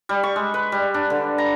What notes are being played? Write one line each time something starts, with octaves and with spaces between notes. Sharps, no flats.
G3
C#6
G#3
B4
G3
D4
D3
A#5